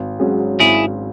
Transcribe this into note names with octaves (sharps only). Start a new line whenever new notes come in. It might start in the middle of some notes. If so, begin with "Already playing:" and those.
Already playing: G#1
G#2 F#3 C#4 G#4
G#1 E4 G#4